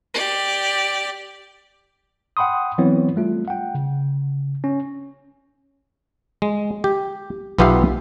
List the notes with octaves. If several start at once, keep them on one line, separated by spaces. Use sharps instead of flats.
G4 D5
F#5 G5 B5 C6 D#6
E3 F#3 B3 C4 E4 C#5
G3 A3 F4
F#5 G5
C#3
C#4
G#3
G4
B1 B3 F4 G4 E5 F5